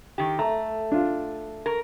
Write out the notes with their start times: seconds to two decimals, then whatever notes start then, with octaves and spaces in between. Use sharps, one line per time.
0.18 D#3 G4
0.39 A3 A#5
0.92 D4 F4
1.66 A#4